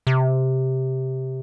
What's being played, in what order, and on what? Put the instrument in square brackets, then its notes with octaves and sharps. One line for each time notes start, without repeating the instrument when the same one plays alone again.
[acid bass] C3